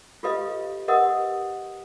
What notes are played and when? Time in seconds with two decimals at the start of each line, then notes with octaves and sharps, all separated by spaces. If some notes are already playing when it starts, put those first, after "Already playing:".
0.23 F4 G4 A4 B4 D#5 F5
0.88 G4 A#4 B4 D#5 F#5 D#6